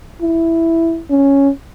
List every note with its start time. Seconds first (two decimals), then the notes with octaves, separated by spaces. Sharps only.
0.22 E4
1.10 C#4